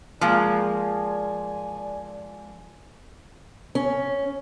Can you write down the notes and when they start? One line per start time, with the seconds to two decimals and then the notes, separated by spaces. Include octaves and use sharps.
0.21 F3 G#3 A#3 D5 G#5
3.75 C#4